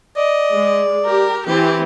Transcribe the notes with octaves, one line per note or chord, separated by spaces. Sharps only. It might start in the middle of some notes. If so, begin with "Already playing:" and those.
D5 D#5
G#3
G4 A#4
E3 C4 G4